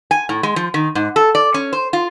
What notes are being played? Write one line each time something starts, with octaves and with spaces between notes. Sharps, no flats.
G#5
A2
G#3
F3
D#3
G#2
A4
D5
C#4
C5
F4